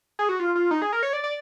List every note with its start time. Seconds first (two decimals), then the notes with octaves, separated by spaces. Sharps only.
0.19 G#4
0.29 F#4
0.40 F4
0.55 F4
0.71 D#4
0.82 G#4
0.93 A#4
1.03 C#5
1.13 D5
1.24 D5